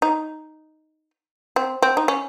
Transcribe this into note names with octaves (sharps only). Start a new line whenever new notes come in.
D#4
C4
C4
D#4
C#4